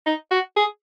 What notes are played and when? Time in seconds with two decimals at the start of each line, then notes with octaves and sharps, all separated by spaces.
0.06 D#4
0.31 F#4
0.56 G#4